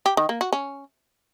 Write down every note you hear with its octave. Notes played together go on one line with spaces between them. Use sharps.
G4
D#3
A#3
F#4
C#4